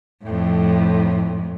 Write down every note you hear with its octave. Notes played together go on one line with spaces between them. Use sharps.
F2 A2